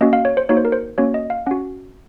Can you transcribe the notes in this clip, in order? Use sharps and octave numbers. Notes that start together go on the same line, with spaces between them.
A#3 C#4 F#4 D#5
F5
C#5
C5
A#3 D#4 F#4 C#5
C5
A#4
C5
A#3 C#4 F#4 C#5
D#5
F5
C#4 F#4 F#5